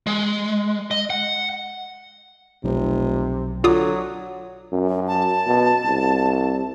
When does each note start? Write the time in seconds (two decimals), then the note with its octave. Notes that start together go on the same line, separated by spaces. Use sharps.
0.07 G#3
0.91 D#5
1.10 F#5
2.64 F1 B1 C3
3.64 D3 F#3 F4 D6 D#6
4.72 F#2
5.08 A5
5.47 B2
5.85 C2